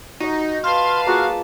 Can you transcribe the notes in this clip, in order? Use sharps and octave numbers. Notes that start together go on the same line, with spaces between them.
D#4 F#4 D#5
B4 F5 A5 C6
A#3 F4 F#4 G#4